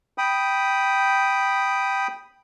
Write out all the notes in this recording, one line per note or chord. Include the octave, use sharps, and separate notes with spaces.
G5 B5 D#6